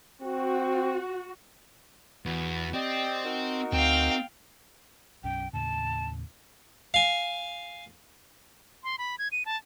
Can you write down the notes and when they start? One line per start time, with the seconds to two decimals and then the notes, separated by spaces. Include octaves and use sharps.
0.22 C4 F#4
2.26 E2 F#4 B4
2.74 C4 G4 D5 D#5
3.24 D#4 F#4 A#4
3.73 D2 C4 F5 G5
5.24 B1 F#2 C#4 G5
5.53 D#2 A2 C#3 A5
6.94 F5 G#5
8.84 C6
8.98 B5
9.19 G#6
9.32 D#7
9.46 A5